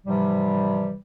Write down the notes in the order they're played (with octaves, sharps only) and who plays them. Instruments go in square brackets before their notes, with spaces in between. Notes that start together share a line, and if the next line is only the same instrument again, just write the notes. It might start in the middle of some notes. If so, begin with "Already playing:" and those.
[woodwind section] G#2 C3 E3 F3 G3